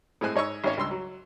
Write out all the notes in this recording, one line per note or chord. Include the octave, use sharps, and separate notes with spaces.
A2 G#3 C4 G#5 F#6
G#2 C#5 D#5 C#6 E6
G#1 C#4 C#5
C#2 G2 C6 E6
F#3